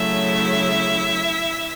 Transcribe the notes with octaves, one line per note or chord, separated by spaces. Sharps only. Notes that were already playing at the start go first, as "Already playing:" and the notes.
Already playing: C#3 F#3 A3 E4 E5